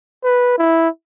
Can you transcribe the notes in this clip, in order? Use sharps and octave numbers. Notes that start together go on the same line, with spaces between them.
B4
E4